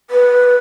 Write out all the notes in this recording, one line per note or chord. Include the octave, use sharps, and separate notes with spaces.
B4